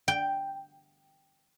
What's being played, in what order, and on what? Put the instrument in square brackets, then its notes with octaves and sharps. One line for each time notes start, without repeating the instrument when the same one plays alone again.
[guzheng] G5